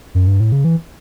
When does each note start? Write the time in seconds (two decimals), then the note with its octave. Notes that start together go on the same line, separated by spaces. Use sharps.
0.15 F#2
0.27 G2
0.40 A2
0.52 C#3
0.65 E3